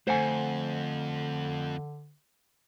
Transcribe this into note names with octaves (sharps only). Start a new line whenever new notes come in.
F2 D3 A3 C5 F#5 G#5